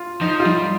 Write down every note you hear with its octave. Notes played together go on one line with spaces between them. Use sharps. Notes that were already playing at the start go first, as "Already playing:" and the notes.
Already playing: F4
F3 D#4
F4
G3 D#4